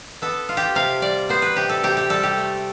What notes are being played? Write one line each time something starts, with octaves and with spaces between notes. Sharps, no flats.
B3 A4
F4
G4
C3 F5
G3 D5
B3 C5
B4
C3 G4
A4
C3 G4
G4
G3 A4
G4
A3